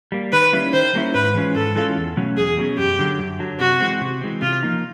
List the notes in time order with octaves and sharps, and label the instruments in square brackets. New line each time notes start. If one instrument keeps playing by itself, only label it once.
[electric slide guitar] G3 A#3
[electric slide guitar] D#3 [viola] B4
[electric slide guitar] G3 A#3 C#4 E4
[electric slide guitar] D#3 [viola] C5
[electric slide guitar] G3 A#3 C#4 E4
[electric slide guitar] G#2 [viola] B4
[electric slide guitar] E3 G#3 C#4 F4
[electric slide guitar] G#2 [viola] A4
[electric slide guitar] E3 G#3 C#4 F4
E2
B2 F#3 A3 C#4
[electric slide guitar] E2 [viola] G#4
[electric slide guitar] B2 F#3 A3 C#4
[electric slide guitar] F#2 [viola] G4
[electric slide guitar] D3 F#3
F#2
D3 F#3
[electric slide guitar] C3 [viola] F#4
[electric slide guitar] E3 G#3 C4
C3
E3 G#3 C4
[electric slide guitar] C3 [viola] F4
[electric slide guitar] F3 A#3 D#4